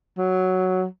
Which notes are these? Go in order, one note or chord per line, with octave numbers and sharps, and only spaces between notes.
F#3